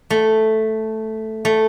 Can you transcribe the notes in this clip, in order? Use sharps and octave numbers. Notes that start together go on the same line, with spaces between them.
A3
A3